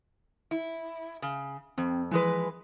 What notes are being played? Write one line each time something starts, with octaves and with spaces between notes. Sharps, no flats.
E4
C#3
F2 C4
E3 F3 G#3 B4